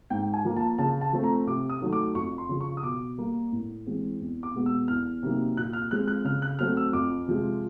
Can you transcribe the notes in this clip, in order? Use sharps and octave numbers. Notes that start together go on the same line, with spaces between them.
G#2 G5
G#5
F3 A#3
A5
C#3 A5
A5
F3 A3 C4
A#5
C3 D6
D#6
D#3 F#3 A3
D6
F2 C#6
C6
C#3 F3
C#6
D#6
B2 D6
G3 A#3
A2
E3 G#3 C4
E2
D6
B2 G#3 B3
E6
E2 F6
C3 D#3 F#3 A#3
A#2 F#6
F6
F3 G#3 C4 F#6
F#6
C#3 F6
F#6
F#3 A3 C4 F6
E6
F2 D6
C3 F3 G#3